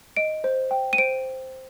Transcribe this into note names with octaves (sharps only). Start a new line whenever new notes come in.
D#5 D7
C5
G5
D#7
C5 D7